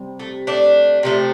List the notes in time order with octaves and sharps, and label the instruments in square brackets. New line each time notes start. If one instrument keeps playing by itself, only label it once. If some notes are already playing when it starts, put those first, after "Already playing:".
Already playing: [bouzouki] C3 G3
A3
A3 D4
C3 F3 A3